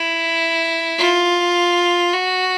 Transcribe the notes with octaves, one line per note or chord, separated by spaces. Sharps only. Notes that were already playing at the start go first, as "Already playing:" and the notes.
Already playing: E4
F4
F#4